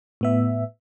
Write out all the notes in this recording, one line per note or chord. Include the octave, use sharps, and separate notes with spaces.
A2 B3 E5